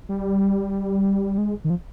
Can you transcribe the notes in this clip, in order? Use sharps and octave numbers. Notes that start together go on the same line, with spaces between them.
G3
G#3
D#3
F3